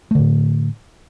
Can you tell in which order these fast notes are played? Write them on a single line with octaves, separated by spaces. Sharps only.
A3 D3 A2